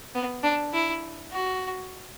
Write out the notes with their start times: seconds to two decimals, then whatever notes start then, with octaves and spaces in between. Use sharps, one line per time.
0.15 B3
0.43 D4
0.73 E4
1.32 F#4